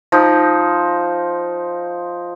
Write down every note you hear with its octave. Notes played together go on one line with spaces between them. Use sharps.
F3 D#4 C5